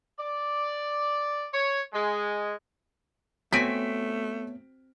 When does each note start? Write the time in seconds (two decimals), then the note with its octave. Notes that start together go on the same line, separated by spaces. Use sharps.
0.18 D5
1.53 C#5
1.93 G#3
3.53 A3 B3 C4 F#4 C#5 G#5 B6 D7